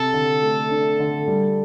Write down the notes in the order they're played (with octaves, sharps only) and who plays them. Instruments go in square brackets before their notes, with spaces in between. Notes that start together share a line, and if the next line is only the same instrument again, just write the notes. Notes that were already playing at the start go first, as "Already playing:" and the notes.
Already playing: [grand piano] C3 [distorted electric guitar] A4
[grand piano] D3
A3
D4
D3
G3